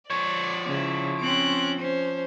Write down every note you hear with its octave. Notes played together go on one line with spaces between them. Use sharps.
F3 C#5 D5
C#3 E4
C4 C#4 F#6 D7
C#4 C5